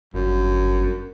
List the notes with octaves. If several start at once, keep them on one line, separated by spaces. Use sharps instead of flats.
G1 F#2